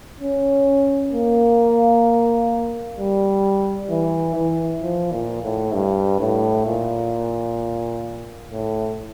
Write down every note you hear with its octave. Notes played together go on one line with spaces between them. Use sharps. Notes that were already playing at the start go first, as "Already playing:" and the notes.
C#4
A#3
G3
E3
E3
F3
A#2
A2
G2
A2
A#2
A2